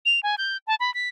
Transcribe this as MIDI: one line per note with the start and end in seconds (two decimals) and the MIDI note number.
0.06 0.20 101
0.23 0.35 80
0.38 0.57 91
0.67 0.75 81
0.80 0.93 83
0.94 1.09 95